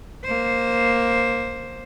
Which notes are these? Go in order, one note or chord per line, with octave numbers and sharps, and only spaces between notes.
A#3 C5